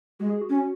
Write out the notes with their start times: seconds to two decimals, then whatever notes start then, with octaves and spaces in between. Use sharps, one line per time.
0.20 G#3 F#4
0.30 G#4
0.41 F#4
0.49 C#4